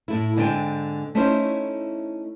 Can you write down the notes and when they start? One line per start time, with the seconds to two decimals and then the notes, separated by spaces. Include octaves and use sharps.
0.08 A2 A3 E4
0.36 G#2 D3 C4 C5 G5 G#5
1.15 A3 C#4 D#4 E4 C5